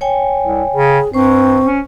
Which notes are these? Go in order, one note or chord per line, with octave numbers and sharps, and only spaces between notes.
C#5 G5 G#5
C2
C#3 G#4
G2 C4 C5 C#6
C#4